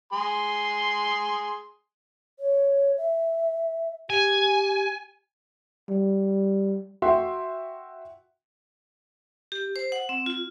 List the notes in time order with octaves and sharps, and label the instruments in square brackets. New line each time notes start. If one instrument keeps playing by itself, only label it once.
[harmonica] G#4 C6
[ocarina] C#5
E5
[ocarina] G4 [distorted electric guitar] G#5
[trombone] G3
[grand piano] F#4 E5 G5 C6
[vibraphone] G4
C5
F#5
C4
F4